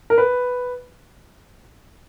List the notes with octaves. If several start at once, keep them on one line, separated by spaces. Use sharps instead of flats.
A#4
B4